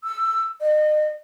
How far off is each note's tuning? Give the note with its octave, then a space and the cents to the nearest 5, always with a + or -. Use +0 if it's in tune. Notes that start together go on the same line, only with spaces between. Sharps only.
E6 +10
D#5 -35